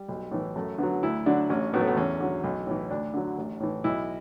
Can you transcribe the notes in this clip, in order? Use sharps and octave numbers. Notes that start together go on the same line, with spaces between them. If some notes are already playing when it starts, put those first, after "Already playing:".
Already playing: G3
B1
A2 E3
F#2 A3
D3 F#3 B3
D2 E4
D3 F#3 D4
A1 C#4
A2 F#3 B3
A3
B3
E2 C#4
D3 F#3
B1
A2 E3
D2 D4
D3 F#3
A1
A2 E3
B1 E4